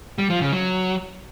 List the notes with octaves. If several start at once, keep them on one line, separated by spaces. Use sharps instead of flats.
G3
F3
C#3
F#3